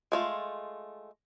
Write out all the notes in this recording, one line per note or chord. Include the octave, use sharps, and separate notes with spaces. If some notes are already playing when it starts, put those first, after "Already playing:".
G#3 A3 F4